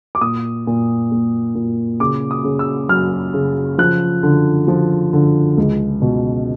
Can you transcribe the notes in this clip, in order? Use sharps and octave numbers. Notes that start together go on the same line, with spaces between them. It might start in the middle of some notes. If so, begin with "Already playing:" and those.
D6
A#2 D#6
A#2
A#3
A#2
C#3 D6
D#6
C#3
E6
F#3 F6
C#3
F3 F#6
D3
F3
D3
C#2
B2